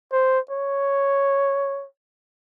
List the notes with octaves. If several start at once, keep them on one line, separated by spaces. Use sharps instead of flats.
C5
C#5